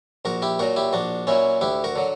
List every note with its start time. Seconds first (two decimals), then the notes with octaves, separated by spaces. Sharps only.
0.25 A#1 F#4 A#4
0.42 E4 G4
0.59 A#2 F#3 F#4 A#4
0.76 E4 G4
0.93 A#1 D4 F#4
1.27 A#2 F#3 C#4 E4
1.61 D2 E4 G4
1.84 F#4 A#4
1.96 D3 F#3